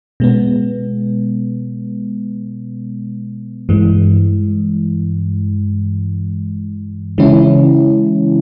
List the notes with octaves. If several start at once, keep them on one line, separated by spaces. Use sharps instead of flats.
B2 G#3 B3
G2 E3 G#3
C#3 E3 G#3 C#4 E4